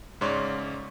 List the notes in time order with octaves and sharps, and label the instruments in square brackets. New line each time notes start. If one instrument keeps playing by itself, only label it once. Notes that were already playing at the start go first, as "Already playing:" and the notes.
[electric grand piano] G#2 C#3 C#5 D5 C6